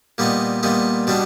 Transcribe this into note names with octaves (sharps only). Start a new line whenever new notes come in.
A#2 G3 B3 D#4
A#2 G3 B3 D#4
B2 G3 B3 D4